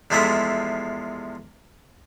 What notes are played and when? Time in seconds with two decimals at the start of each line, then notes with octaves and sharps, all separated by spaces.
0.10 E2 C3 F3 G#3 A3 E5